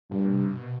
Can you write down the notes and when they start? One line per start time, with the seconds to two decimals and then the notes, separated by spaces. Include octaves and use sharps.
0.11 G2 A#2
0.32 C3
0.53 B2